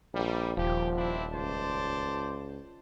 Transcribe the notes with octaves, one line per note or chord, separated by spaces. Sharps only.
A#1 G3
D#1 F3 G4
C4 D4 E4
C#2 C5 D5 A5